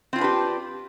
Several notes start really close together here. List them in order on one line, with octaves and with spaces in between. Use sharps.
C4 F4 D4 B4 G4